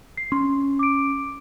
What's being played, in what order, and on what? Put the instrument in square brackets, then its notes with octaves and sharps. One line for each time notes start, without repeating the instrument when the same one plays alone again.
[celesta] C7
[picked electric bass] C#4 [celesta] C6
[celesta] D6 D7